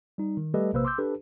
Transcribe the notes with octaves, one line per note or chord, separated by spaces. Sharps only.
G3 D#4
D#3
G3 A3 G4 A4 B4 D#5
A#1 C3 A#3 B4 C5 E6
C6 D6 E6 G6
D4 G4 A4 B4